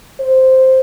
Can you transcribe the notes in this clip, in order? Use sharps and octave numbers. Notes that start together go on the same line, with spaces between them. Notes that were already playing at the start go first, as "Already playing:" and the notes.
C5